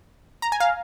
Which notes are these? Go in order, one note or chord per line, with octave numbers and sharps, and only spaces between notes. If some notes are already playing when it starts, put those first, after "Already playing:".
A#5
G#5
F5